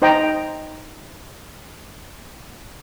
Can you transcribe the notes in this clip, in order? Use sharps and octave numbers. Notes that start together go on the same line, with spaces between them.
D#4 C5 D#5 G5 A#5